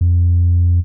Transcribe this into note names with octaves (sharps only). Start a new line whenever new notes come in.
F2